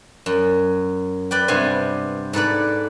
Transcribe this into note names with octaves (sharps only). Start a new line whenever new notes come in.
F#2
B4 D5 G5
G2 C3 B3 C4 G#5
G#2 A4 B4 D5